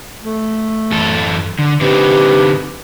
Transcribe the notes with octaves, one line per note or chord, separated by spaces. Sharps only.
A3
F#2 E3 A4
D3
D3 C4 D#4 G4 B4